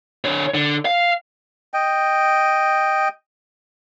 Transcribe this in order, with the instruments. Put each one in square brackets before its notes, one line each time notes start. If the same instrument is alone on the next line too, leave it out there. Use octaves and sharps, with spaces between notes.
[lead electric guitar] D3 C#5
D3
F5
[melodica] D#5 G5